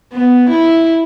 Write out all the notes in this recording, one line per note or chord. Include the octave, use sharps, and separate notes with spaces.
B3
E4